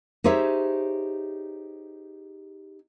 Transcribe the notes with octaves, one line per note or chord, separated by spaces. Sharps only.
D#4 G4 G#4 C5 C#5 E5